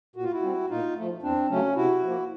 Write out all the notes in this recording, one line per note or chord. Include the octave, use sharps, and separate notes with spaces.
A#2 F#4
F4
E4 F#4
G3 C4
A#2 D#4 F4
F3 A3
E2 C4 D4
C#3 F#3 A3 C#4
C3 E4 F#4
F3 A#3